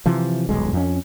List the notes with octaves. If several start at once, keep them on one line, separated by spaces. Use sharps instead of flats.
C3 E3 F3
D#1 B1 G#3
F2 C#4